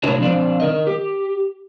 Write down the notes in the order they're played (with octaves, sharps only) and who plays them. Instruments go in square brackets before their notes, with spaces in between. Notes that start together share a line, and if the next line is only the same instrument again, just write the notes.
[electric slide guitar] A2 C3 D4 F#4 C#5
F3 C4 D4 D5
D#3 A#4 D#5
G4